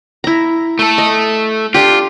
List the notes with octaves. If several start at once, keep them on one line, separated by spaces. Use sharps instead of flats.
E4 A#5
A3 A4
D#5
D4 F4 G4